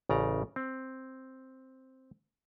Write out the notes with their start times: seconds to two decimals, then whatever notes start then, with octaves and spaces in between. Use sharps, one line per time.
0.09 A1 C#3 D5 A#5
0.56 C4